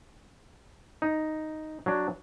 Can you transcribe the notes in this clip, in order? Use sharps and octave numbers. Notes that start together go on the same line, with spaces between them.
D#4
F#3 D4